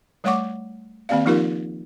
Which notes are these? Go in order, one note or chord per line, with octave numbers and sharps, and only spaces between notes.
G3 A3 C#5 F#5 C#6 D6
D#3 A#3 C4 G4 D5 F5
F3 A#3 D#4 F4 G4 A#4